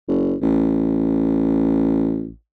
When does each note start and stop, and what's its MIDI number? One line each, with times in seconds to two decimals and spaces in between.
0.08 0.35 30
0.41 2.31 33